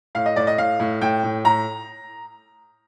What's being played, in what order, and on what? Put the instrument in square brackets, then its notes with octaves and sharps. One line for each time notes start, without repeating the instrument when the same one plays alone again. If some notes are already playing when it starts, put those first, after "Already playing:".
[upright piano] A2 F5
D#5
A2 D5
D#5
A2 F5
A2
A2 G5
A2
A2 A#5